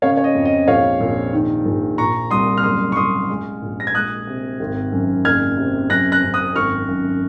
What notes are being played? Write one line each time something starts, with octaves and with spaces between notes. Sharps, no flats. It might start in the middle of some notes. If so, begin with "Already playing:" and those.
C#3 C#5 F5
C#5
D#5
F2
D#5
A#1 C#5 F5
A#1
D#3
A#1
A#2 A#5 C#6
C2 C6 D#6
F6
F#1 C6 D#6
C#6
F#1 C6 D#6
G#3
A#1
A#6
G#6
G#3 D#6 F#6
C3
G#1
F#2
F#1 F6 G#6
C3
F#2 F#6 A#6
F#6 A#6
F#2
D#6 F#6
G#1 C#6 F6
F#2